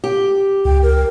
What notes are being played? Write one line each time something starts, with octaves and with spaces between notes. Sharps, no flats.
G4
C#2 G5
A#4